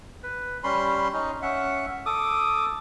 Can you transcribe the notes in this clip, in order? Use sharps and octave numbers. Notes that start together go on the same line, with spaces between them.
B4
G3 C#4 B5 C6
C#4 D#4
C#4 E5 F#5
A4 D6 D#6